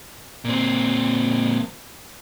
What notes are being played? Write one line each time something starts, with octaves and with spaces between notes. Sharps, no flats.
A#2 C4